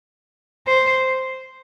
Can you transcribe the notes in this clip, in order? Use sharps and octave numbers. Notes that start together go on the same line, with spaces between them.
C5